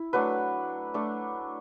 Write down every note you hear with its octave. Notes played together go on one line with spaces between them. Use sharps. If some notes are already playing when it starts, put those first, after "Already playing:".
Already playing: E4
F#3 A3 D4 B4
A3 D4